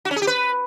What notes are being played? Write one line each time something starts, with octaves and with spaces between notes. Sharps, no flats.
F#4
C#4
G#4
G4
B4